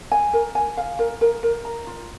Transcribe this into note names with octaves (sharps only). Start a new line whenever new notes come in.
G#5
A#4
G#5
F5
A#4
A#4
A#4
A#5
F4